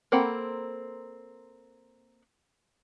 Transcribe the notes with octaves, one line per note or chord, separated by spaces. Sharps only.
A#3 C4 A4 F#5 B5